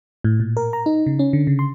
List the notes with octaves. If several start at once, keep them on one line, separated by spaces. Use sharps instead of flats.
A2
A#2
A#4
A#5
D#4
C#3
C#4
D3
C#3
C6